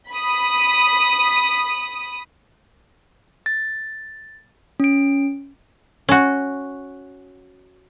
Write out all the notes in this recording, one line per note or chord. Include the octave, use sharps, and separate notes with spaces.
B5 D#6
A6
C#4 D7
C#4 F#4